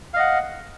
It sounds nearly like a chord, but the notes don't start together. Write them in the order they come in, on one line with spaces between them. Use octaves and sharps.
F5 D#5 F#5